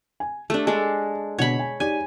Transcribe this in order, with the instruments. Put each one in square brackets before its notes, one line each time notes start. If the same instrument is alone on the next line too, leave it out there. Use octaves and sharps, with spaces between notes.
[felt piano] G#5
[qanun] A3 D4 [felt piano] G4
[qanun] G#3 D4 A4
[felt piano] B2 D3 G#4 [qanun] C#5 B5
[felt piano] G#5
[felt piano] D#4 G4 D5 [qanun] G#5